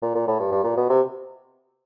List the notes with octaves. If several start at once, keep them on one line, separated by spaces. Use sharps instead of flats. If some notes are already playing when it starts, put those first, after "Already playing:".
A#2
A#2
A2
G2
G2
A#2
B2
C3